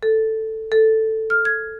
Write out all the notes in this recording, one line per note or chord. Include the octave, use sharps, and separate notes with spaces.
A4
A4
F6
G#6